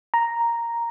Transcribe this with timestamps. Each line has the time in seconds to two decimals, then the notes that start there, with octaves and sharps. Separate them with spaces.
0.14 A#5